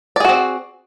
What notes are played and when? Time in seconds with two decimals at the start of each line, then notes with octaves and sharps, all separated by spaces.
0.16 D5
0.20 G#4
0.25 F#4
0.29 C4